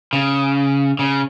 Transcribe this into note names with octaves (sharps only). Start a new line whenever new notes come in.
C#3
C#3